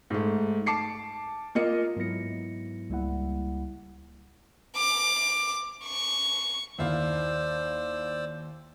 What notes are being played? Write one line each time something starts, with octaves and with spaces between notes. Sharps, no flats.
G#2 A3
A5 D6 C7 C#7
A#3 F4 A#4 D#5 C#7
G#2 F#3 B3 E4 A#6 C#7
C#2 G3 A#3 E4 F#5
D6
C#6
D#2 E4 C5 D5 F5 E6